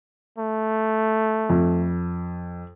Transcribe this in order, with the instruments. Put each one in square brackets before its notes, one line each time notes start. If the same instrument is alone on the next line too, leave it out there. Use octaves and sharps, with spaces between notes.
[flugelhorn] A3
[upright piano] F2